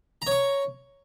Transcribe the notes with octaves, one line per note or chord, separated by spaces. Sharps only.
C#5 A#5 C#6